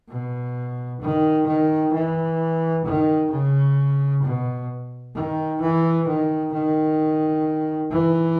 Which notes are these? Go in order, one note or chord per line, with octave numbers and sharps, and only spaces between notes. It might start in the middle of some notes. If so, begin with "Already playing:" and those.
B2
D#3
D#3
E3
D#3
C#3
B2
D#3
E3
D#3
D#3
E3